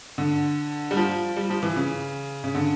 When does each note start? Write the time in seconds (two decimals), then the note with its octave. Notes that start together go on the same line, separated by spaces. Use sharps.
0.18 D3
0.91 G3
0.97 F3
1.37 G3
1.50 F3
1.63 E3
1.76 C#3
2.44 C#3
2.55 D3